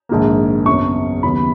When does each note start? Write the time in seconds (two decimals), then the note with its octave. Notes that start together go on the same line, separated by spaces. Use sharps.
0.09 A#1 G#2 D#3 A#3
0.66 F#2 C#3 F#3 B3 C#6
1.23 D#2 C#3 F#3 B3 B5